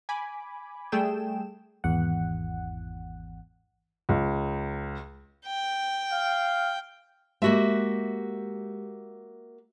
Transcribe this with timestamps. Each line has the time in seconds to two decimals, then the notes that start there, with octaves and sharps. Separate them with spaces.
0.09 G#5 B5 D6
0.92 G3 A3 G#4 A4 G5 E7
1.84 G#1 E2 F#5
4.09 C#2
5.46 G5
6.12 F5
7.42 G#3 A#3 F#4 G4 E5